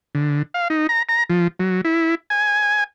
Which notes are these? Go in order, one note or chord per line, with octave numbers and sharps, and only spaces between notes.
D3
F5
D#4
A#5
A#5
F3
F#3
E4
G#5